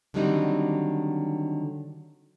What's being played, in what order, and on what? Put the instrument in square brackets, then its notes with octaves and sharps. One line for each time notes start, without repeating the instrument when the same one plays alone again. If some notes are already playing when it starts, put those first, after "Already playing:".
[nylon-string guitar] D3 D#3 F#3 G3 C4 D#4